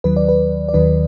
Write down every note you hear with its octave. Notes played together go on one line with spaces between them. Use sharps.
D#2 D#3 F#3 B4
D5
B4
D5
D#2 D#3 F#3 B4